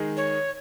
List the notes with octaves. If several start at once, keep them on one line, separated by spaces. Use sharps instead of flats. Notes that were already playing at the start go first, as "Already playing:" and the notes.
Already playing: D#3 G#3 D#4 G#4
C#5